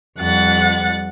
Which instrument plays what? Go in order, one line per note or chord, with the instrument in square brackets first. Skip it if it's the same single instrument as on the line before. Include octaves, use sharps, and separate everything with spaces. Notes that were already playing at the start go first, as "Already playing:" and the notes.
[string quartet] F2 G3 F#5 F#6 A6